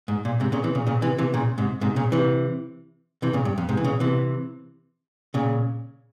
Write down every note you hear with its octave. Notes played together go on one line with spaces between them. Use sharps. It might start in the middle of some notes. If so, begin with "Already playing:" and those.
G#2
A#2
G#2 C3
A#2 C#3
C3 E3
A#2 C#3
A#2 C#3
C3 E3
C3 E3
A#2 C#3
G#2 C3
G#2 C3
A#2 C#3
C3 E3
C3 E3
A#2 C#3
G2
F2
G#2 C3
E3
A#2 C#3
C3 E3
A#2 C#3